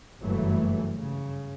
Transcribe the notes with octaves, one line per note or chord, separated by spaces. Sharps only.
F#1 G2 E3 F#3 A3
C#3